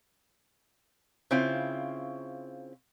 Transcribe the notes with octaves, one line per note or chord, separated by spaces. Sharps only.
C#3 C4 E4 F4